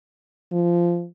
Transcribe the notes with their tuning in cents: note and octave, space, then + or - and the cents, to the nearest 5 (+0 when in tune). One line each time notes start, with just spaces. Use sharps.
F3 -15